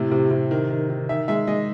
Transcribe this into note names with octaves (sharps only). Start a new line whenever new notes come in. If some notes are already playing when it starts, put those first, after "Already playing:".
Already playing: A2 C3
C3
C3
D#3
D#3
D#3
D#3 E5
G#3 E5
G#3 D#5